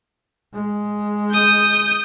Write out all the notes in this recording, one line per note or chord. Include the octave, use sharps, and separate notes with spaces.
G#3
D#6 G6